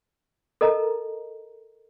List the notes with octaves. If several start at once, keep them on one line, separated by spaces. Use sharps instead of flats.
A4 A#4 D#5 A5 A#5